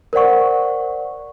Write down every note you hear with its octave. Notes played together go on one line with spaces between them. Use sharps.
A#4 C5 D5 F#5 C#6